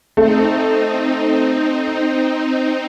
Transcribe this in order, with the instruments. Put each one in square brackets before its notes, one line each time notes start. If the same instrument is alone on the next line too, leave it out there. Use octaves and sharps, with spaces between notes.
[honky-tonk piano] A3 [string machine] C4 D#4